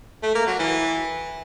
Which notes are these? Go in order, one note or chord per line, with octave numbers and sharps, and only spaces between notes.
A3
A#3
F#3
E3